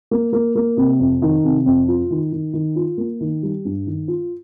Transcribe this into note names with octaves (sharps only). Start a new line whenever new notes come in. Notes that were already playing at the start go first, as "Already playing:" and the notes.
A#3
A#3
A#3
C3
F2
D#3
C3
F2
F4
D#3
D#3
D#3
F4
A#3
D#3
G3
G2
D#3
F4